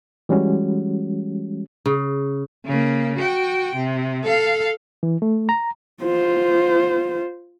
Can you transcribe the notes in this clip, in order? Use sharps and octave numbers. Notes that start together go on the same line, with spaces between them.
E3 G3 G#3 C#4 F#4
C#3
C#3 A#3
F#4 G5
C3
A4 F5
E3
A3
A#5
F4 C5